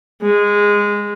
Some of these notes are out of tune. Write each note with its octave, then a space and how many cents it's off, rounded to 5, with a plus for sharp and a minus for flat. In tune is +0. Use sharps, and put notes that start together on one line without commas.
G#3 -15